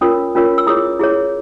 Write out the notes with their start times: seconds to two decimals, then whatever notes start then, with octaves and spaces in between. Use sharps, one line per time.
0.01 C#4 F4 A#4 C#5 D#6
0.35 C#4 F4 A#4 C#5
0.58 E6
0.67 E4 G#4 C#5 D#6
1.00 E4 G#4 C#5